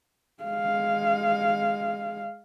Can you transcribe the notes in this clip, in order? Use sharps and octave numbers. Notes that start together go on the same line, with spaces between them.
G#3 F5